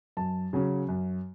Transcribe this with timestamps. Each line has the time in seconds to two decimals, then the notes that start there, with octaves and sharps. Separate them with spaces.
0.17 F#2 A5
0.53 C#3 F#3 C#4
0.89 F#2